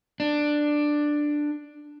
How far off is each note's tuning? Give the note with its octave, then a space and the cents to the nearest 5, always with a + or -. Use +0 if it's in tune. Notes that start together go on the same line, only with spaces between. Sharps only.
D4 +10